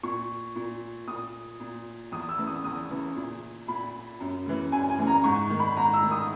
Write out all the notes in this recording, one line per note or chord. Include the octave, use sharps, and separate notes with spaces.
A#2 C#6
A#2
A#2 D#6
A#2
E2 D#6
E6
C#3 E3
D#6
E2 D#6
C#3 E3
A#2
A#2 B5
F#2
C#3 E3
F#2 G#5
G#5
C#3 E3
A#5
G#2 C#6
D#3
B5
G#2 A#5
E6
D#3
D#6